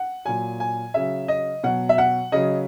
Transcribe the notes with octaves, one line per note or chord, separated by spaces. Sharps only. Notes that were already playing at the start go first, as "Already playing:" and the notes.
Already playing: F#5
A#2 F#3 G#5
G#5
C#3 F#3 E5
D#5
B2 F#3 F#5
E5
F#5
C#3 F#3 D#5